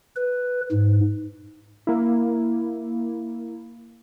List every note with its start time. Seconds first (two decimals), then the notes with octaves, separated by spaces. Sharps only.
0.16 B4
0.72 G#2
1.87 A#3 E4